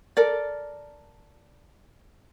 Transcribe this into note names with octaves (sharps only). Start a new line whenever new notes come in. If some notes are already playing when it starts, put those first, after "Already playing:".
A4 A#4 D5